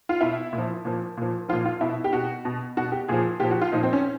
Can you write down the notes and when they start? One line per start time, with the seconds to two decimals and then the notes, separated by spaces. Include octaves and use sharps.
0.09 F4
0.21 B2 E4
0.53 A#2
0.58 F3
0.85 A#2 F3
1.17 A#2 F3
1.49 F3 F4
1.53 A#2
1.65 F4
1.81 B2 E4
2.04 G4
2.13 B2 F#4
2.45 B2
2.77 B2 F#4
2.92 G4
3.08 A#2 F3 G#4
3.40 A#2 F3 G4
3.51 F#4
3.61 F4
3.72 A#2 F3 D#4
3.83 C4
3.93 C#4